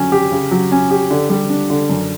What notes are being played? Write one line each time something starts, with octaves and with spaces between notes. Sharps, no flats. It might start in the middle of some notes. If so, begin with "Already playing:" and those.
Already playing: D3 F#3 C#4
G4
C#3
F#3
C#4
G4
D3
G3
D4
D3
F#2